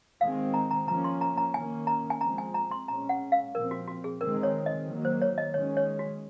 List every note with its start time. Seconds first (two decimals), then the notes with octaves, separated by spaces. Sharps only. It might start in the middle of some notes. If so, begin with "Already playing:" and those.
0.21 D#3 G#3 C4 F5
0.54 A#5
0.71 A#5
0.88 F3 A#3 C#4 A#5
1.04 C6
1.21 A#5
1.37 A#5
1.54 D#3 A#3 C#4 G#5
1.87 A#5
2.10 G#5
2.21 F3 G#3 C4 A#5
2.38 G#5
2.54 A#5
2.71 C6
2.88 A#2 G#3 C#4 A#5
3.09 F#5
3.32 F5
3.55 A#2 F3 C4 A#4
3.71 F#4
3.87 F#4
4.04 G#4
4.21 D#3 G#3 C4 A#4
4.43 C#5
4.66 D#5
4.88 D#3 F#3 A#3
5.05 C5
5.22 C#5
5.38 D#5
5.54 D#3 G#3 C#4 C#5
5.77 C#5
5.99 F#4